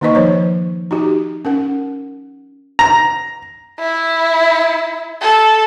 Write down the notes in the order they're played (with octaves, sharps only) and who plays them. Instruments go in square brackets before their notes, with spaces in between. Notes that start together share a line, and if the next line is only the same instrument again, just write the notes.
[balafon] D#3 A#3 D#4 B4 D#5 C#6
F3 C5 C#5
D#4 F#4 G4
C#4 A#4 F#5
[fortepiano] A#5
[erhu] E4
A4